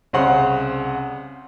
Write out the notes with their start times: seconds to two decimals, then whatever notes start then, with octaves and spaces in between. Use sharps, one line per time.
0.13 C2 C#3 C4 C5 F#5 C6